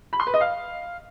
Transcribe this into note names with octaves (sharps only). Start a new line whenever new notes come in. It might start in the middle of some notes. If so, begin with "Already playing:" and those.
B5
C6
B4
D#5
F5